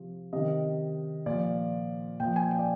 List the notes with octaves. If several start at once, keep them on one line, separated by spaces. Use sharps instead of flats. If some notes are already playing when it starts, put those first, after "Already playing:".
Already playing: C3 F3
C3 D#3 D#5
A#2 F3 D5
A#2 F3 G5
G#5
G5
D5